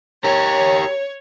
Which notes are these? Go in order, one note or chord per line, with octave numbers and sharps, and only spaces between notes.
G4 A#4 C#5